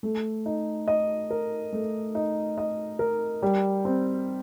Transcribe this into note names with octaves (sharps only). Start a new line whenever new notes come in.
A3
D#4
D#5
A#4
A3
D#4
D#5
A#4
G3
C4